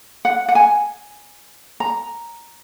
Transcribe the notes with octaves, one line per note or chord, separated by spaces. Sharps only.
F#5
F#5
G#5
A#5